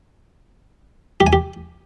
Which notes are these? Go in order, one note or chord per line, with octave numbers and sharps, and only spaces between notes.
G4
G#5
G4